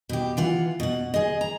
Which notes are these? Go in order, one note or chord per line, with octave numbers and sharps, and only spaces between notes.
B2 G4
E3 F4 F#5
B2 F#5
G#4 D#5
A#5